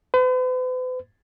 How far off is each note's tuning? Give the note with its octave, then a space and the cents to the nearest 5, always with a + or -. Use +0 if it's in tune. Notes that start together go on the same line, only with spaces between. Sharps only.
B4 +45